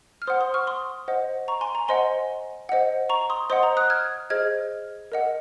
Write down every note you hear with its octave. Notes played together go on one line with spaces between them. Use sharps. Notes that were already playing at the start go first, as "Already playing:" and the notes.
F6
C5 F#5 C6 D#6
C6 D#6
C#6 F6
C6 D#6
C5 D#5 F#5
A#5 C#6
G#5 C6
A#5
C5 D#5 F#5 G#5 C6
C5 D#5 F#5
A#5 C#6
C6 D#6
C5 D#5 F#5 C6 D#6
A#5
D#6 F#6
F6 G#6
G#4 C5 D#5 F6 G#6
A#4 D#5 F#5